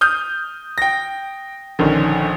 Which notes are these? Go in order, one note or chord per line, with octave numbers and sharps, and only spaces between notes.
D#6 F6 G6
G5 A#6
A#1 D3 D#3 C#4